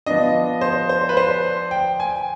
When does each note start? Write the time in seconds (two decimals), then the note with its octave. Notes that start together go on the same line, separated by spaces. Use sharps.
0.06 F3 B3 D4 D#5
0.61 C5
0.89 C5
1.09 B4
1.17 C5
1.71 G5
2.00 G#5